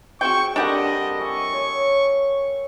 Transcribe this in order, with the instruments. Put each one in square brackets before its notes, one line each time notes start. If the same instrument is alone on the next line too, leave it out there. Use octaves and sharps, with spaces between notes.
[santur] C4 G#4 [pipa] F#4 G5 [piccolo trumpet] C#6
[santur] G3 A3 A#3 [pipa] D4 G4 F#5 [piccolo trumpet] D#5
[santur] D5 E5 G#5 [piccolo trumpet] C#6
[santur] C#5